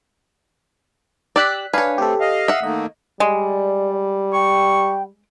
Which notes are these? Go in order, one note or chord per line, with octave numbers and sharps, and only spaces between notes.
G4 D5 E6 F#6 B6
D4 B4 C#5 F5 G#5
A3 C4 G4 A4
D#5 F5
E5 F#5
D#3 A3 A#3 D#5
G3 G#3 D5
G5 C#6